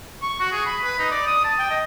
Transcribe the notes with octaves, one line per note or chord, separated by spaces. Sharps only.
C#6
F#4
G#4
B5
B4
D#4
D5
D#6
A5
G5
D#5